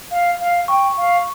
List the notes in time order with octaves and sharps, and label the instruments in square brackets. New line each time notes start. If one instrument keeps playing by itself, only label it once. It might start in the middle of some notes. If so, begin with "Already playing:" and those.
[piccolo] F5
F5
[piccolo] G5 [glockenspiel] C#6
[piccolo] F5